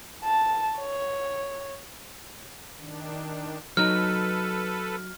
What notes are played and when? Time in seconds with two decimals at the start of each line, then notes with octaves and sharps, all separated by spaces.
0.25 A5
0.79 C#5
2.77 D#3 D4
3.77 F#3 D#4 A4 B4 F6